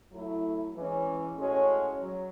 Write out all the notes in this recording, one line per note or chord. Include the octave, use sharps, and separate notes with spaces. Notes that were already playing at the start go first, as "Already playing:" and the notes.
F#3 A3 E4
E3 G#3 C#4
A2 G#3 C#4 F#4 C#5
F#3